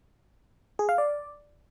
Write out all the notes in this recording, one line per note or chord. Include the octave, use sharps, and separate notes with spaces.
G#4
F5
D5